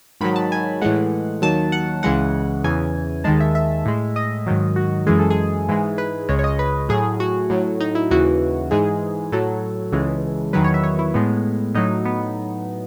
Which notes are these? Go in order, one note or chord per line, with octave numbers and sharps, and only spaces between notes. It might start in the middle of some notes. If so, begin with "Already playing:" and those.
G#2 D#3 F#3 B5
A5
G#5
A2 E3 G#3 F#5
D#2 D#3 F#3 A5
F#5
C#2 C#3 E3 G#3 F#5
E2 C#3 E3 G#5
D#2 D#3 G#3 A5
E5
E5
A2 G#3
D#5
G#2 D#3 F#3
F#4
F#2 E3 G#3 G#4
A4
G#4
G#2 E3 G#3
B4
C#2 C#3 G#3 C#5
C#5
D#5
B4
A2 F#3 G#4
F#4
A2 F#3
D#4
E4
D#2 C#3 E3 F#4
G#2 E3 G#3 G#4
A2 F#3 A4
C#2 C#3 E3 G#3
E2 D#3 F#3 B4
C#5
E5
C#5
E4
A2 G#3 B3
A2 F#3 D#4
B3